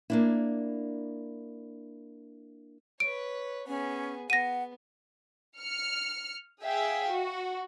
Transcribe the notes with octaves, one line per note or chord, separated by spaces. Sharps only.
A#3 D4 E4
B4 C#5 D7
B3 C#4 G#4
B3 F#5 A#6 D#7
F6 C#7
G#4 E5 F5 G5
F#4